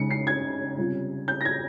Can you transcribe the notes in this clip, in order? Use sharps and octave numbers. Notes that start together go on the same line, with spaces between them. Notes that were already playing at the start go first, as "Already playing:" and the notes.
Already playing: C#3 G#3 D#4 C#7
C7
G#6
C3 G3 C#4 F4
G6
A#6
G#6